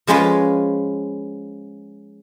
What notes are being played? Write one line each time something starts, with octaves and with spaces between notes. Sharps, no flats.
F3 G#3 C#4 F4 B4